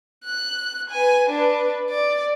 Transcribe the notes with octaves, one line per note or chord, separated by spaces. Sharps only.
F#6
B4 G#5
D4 B4
D5